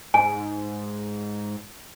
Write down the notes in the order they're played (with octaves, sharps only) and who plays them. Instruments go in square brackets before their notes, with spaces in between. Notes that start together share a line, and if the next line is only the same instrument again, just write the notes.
[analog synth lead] G#2 [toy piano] G#5